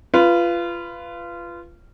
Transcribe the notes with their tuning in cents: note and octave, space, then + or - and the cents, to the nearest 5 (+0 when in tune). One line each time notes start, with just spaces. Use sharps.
F4 -20 B4 +0